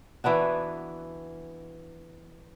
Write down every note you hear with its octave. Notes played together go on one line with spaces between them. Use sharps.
E3 B3 D4 F#4